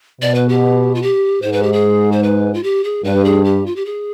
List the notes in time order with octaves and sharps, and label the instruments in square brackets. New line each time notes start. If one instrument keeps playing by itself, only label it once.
[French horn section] B2 [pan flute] D5
[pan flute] B4
G4
F4
G4
[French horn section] G#2 [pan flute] C5
[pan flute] B4
G4
G#4
C5
B4
F4
G4
G#4
[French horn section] G2 [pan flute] B4
[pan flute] G#4
G4
F4
G4
G#4